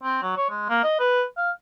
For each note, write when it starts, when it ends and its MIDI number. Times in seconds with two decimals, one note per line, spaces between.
0.03 0.18 60
0.22 0.35 54
0.37 0.47 73
0.50 0.65 56
0.69 0.79 58
0.84 0.99 75
1.00 1.23 71
1.37 1.51 77